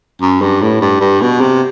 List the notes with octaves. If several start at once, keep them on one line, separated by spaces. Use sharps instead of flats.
F#2
G2
A2
G2
G2
B2
C3